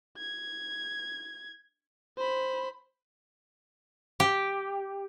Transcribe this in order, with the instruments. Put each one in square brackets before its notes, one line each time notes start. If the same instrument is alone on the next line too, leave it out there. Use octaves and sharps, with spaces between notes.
[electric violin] G#6
C5 B5
[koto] G4